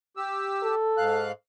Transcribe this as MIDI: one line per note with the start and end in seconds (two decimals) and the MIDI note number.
0.17 0.75 67
0.17 0.75 88
0.63 1.27 69
0.97 1.32 44
0.97 1.32 77
0.97 1.32 90